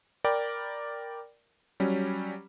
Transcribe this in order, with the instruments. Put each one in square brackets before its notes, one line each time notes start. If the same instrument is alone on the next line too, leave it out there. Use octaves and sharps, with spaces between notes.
[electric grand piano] A#4 D5 G5 B5
F#3 G3 C#4